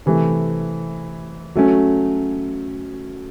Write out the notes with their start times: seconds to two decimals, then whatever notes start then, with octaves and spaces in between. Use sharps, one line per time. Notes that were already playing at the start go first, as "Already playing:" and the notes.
0.06 C3 E3 A3
1.55 F#3 A3 C#4